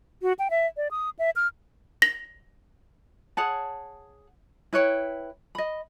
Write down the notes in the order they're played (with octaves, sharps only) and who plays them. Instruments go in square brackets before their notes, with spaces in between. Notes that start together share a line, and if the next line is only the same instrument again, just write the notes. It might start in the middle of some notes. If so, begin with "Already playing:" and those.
[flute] F#4
G5
E5
D5
D#6
E5
F6
[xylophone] A#6
[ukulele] G#4 C#5 F#5 A5
E4 B4 C#5 G5
D#5 B5